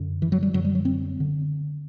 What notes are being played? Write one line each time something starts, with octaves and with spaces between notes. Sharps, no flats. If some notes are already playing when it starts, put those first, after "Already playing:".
Already playing: F#2 D3
E3
F#3
G3
F#2 D3 F#3
G3
F#3
C4
D3